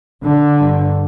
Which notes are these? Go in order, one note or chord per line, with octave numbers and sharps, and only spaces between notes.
D3
G2